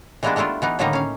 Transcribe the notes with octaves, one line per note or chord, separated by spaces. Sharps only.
E3 G3 G#3 A#3 B3 D4
G3 A3 D4 E4 F4
E3 B3 D#4
A2 D3 D#3 G3 A#3 D#4
C#4 F5